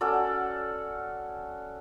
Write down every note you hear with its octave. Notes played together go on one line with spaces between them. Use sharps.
C#4 F#4 A4 D5